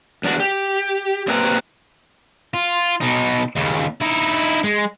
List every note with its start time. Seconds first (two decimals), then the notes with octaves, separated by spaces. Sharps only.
0.23 E2 D4 F#4
0.40 G4
1.28 A#2 C4 G4 B4 G5 A#5
2.54 F4
3.01 B2 D#4
3.55 D#2 C#3
4.01 D#4 E4
4.64 G#3